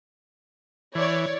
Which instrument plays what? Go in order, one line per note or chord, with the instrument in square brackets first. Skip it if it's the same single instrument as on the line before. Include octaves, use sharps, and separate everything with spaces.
[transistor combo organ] E3 [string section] C#5 D5